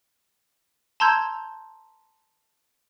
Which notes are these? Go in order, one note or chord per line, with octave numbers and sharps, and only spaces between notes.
A5 A#5 C6 E6 G6 G#6